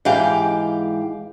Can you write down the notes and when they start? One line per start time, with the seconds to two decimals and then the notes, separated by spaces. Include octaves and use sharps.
0.05 G#2 E3 G4 F5 G5